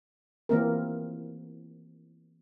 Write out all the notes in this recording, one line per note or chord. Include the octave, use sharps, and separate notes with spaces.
E3 A#3 C4 A#4